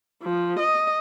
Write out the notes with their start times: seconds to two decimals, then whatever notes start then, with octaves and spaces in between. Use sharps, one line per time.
0.22 F3
0.59 D#5